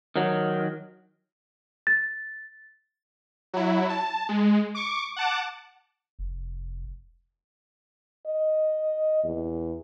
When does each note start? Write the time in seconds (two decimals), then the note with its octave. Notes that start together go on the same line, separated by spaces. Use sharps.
0.16 D#3 F#3
1.87 A6
3.54 F#3 E4
3.89 A5
4.29 G#3
4.75 C#6 D6
5.16 F#5 A5 D6
6.19 F1
8.26 D#5
9.24 E2